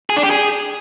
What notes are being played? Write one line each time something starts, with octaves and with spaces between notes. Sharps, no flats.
G#4
D4
G4
G#4